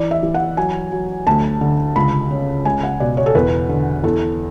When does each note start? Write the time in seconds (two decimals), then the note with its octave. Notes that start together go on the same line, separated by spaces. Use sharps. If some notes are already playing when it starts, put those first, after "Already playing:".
Already playing: E3 D5
0.11 E5
0.23 E3
0.34 F#5
0.57 F#3 G#5
0.92 F#3
1.27 D2 A5
1.61 D3
1.96 C#2 B5
2.31 C#3
2.65 C#2 G#5
2.83 F#5
3.00 B2 D5
3.17 C#5
3.26 A4
3.35 E2 B4
3.69 D3
4.04 E2 A4